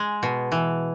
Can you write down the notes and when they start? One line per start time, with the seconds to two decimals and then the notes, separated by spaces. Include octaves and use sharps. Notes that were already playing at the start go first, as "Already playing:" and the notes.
Already playing: G#3
0.23 B2
0.52 E3